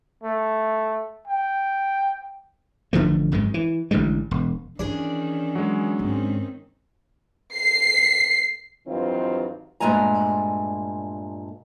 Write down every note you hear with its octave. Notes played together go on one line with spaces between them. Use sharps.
A3
G5
A1 D3 F3 A3
G#1 F#2 D#3 G#3
E3
A1 D3 G3 G#3
E1
D#3 E3 C#4 D4 G#4 D5
F#3 G#3
G#2 D#3 C4 C#4
C7
G2 D#3 E3 F#3 C4 F4
G2 A#2 G#3 A3 G#5 A#5